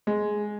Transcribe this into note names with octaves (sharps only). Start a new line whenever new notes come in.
G#3